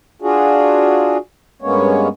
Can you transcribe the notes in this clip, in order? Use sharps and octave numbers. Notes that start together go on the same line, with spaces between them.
D4 F4 F#4 G#4
G2 G#3 A#3 B3 C#4 C#5